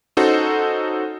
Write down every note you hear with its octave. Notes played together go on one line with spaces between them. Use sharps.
C#4 D#4 F#4 A4 C5